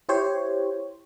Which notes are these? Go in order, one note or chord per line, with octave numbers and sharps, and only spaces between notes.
E4 G4 C5 C#5